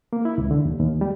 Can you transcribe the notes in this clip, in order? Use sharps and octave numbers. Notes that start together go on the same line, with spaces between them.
A#3
E4
C#2
D3
D#2
D#2
G3